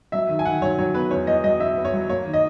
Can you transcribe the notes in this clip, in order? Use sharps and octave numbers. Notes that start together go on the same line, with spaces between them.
F#3 E5
D#3
G#5
D#3 F#5
F#3 C#5
F#3 C#5
B3 B4
E2 C#5
E2 D#5
F#3 D#5
E2 E5
B3
C#5
F#3
A#3 C#5
D#3
D#5